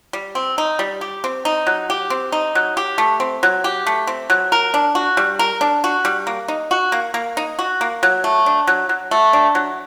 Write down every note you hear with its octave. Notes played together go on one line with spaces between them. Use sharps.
G3
C4
D#4
G3
G4
C4
D#4
F#3
G4
C4
D#4
F#3
G4
A3
C4
F#3
G4
A3
C4
F#3
A#4
D4
F#4
G3
A#4
D4
F#4
G3
A#3
D#4
F#4
A#3
A#3
D#4
F#4
A#3
F#3
A3
D4
F#3
F#3
A3
D4
F#3